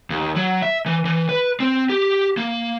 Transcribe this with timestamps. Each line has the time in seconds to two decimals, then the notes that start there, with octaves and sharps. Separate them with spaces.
0.10 D#2
0.36 F#3
0.62 E5
0.86 E3
1.05 E3
1.29 B4
1.60 C4
1.90 G4
2.37 A#3